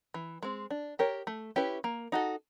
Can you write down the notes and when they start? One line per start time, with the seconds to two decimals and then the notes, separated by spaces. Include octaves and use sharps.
0.14 E3
0.43 G#3 C4
0.71 D4
0.99 G4 A#4 C#5
1.27 A3
1.56 C#4 E4 G4 B4
1.84 A#3
2.12 D#4 F#4 A4